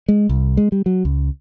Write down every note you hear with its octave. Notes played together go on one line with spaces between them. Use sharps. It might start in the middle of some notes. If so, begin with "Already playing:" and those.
G#3
C2
G#3
G3
F#3
C#2